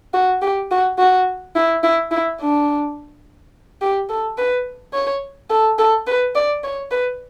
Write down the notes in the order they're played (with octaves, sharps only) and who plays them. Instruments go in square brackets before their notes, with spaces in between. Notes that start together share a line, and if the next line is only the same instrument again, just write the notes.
[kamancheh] F#4
G4
F#4
F#4
E4
E4
E4
D4
G4
A4
B4
C#5
A4
A4
B4
D5
C#5
B4